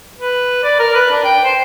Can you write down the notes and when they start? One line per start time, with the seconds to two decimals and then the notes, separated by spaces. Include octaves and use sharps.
0.18 B4
0.63 D5
0.79 A#4
0.94 B4
1.11 D4
1.24 G5
1.44 C5